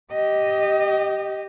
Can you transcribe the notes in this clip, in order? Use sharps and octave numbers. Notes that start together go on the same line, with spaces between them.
G4 D#5